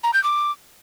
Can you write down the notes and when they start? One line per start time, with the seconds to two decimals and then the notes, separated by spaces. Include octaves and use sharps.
0.04 A#5
0.14 G6
0.24 D6